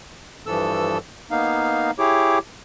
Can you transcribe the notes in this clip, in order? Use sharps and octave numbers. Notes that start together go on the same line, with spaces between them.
G2 E3 F3 A4 E6
A#3 B3 D#4 F5
E4 G4 G#4 C#5 D6